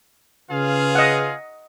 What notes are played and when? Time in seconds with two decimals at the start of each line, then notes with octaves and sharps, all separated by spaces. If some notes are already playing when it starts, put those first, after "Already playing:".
0.50 C#3 F4 G#4 B4 F5
0.95 D#5 F#5